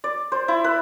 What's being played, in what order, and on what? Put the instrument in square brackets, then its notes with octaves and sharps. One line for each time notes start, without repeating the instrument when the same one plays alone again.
[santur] D5
C5
E4
B4